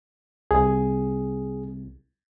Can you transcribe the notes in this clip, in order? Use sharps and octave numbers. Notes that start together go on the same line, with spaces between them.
C2 G#4